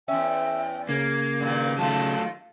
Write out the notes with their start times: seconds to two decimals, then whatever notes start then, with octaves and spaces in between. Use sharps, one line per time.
0.08 E2 C#4 E5 G5
0.89 C#3 A#3 G#6
1.40 G2 A#2 D#3
1.78 D#2 D#3 F#3 A3 F4 A5